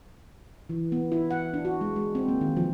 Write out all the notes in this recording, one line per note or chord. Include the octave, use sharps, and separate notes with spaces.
E3
B3
E4
F#5
D4
F#4
G#3
G#3
C4
A#3
D#3
F3